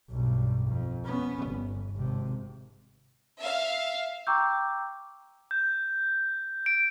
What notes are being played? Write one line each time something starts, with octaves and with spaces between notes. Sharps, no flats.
B1 G2
F2
B3 C#4
G1
G#1 C3
E5 F5
G5 A#5 C#6 D6 E6 G6
G6
D7